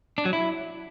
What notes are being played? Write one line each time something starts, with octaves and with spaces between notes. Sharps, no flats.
D4
F#3
E4